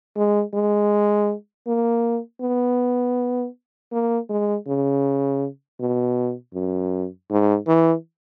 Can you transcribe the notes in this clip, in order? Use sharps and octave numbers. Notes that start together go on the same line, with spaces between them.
G#3
G#3
A#3
B3
A#3
G#3
C#3
B2
F#2
G#2
E3